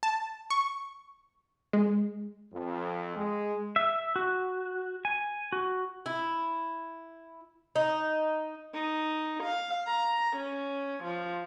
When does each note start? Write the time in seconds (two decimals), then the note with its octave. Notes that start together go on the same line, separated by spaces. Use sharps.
0.03 A5
0.50 C#6
1.73 G#3
2.53 F2
3.16 G#3
3.76 E5
4.16 F#4
5.05 G#5
5.52 F#4
6.06 E4
7.76 D#4
8.74 D#4
9.43 F5
9.87 A#5
10.36 C#4
11.04 F3